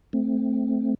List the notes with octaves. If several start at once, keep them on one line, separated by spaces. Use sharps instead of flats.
A3 C4